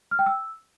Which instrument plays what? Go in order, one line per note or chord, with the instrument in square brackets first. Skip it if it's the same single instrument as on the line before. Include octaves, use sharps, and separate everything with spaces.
[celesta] F6
G5
E6